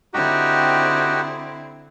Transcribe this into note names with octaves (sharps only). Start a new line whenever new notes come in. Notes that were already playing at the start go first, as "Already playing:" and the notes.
D3 C4 D#4 E4 F#4 G4